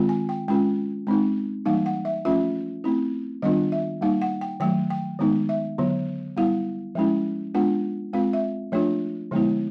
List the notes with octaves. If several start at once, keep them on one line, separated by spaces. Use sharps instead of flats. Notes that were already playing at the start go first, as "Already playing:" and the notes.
Already playing: D#3 G#3 C4 F4
G#5
G5
G#3 C#4 F4 G5
G#3 C4 D#4
E3 G3 A#3 D#4 F5
F#5
E5
F3 A3 C#4 F4 E5
A3 C4 E4
D#3 G3 B3 D4 F4 D#5
E5
G3 A#3 D#4 F5
F#5
G5
D#3 F#3 A3 G5
G5
D#3 G#3 B3 D#4
E5
D3 F#3 B3
G3 B3 E4 F5
F3 G#3 C#4 E4
G#3 B3 D4 F4 F#5
G#3 C4 F4 F5
E5
F3 A3 D4 F4 C#5
D3 F3 G#3 B3 E4